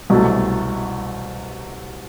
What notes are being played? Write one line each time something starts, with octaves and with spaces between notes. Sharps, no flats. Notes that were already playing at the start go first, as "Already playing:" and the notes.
C2 B2 F#3 A3